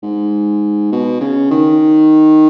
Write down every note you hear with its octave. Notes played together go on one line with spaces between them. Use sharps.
G#2
B2
C#3
D#3